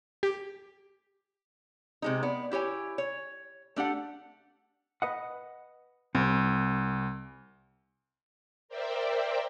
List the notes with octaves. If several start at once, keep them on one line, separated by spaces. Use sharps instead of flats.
G4
C3 G#3 D#4
B3 D5
E4 G4 C#5 G#5
C#5
A3 D4 G4 F#5
B4 D#5 F#5
C2 C4
A#4 C5 D5 E5 G5